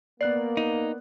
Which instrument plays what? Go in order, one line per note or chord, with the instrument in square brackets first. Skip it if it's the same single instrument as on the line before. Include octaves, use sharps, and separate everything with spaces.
[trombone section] A#3 [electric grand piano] B3 F#6 C7 [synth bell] D5
[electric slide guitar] D#4